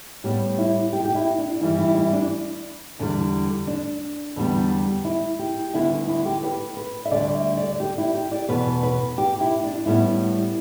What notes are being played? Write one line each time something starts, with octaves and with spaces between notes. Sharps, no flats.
A2 G3 B3 G4
E4
G4
G4
E4
D4
G2 E3 G3 E4
E4
E4
D4
E2 D3 G3
D4
E2 D3 G3 B3
E4
G4
D2 D3 G3 B3 E4
E4
G4
B4
B4
E5
D2 D3 G3 D5
E5
D5
G4
E4
G4
D5
E2 B2 B3 B4
B4
G4
E4
D4
A2 G3 B3 E4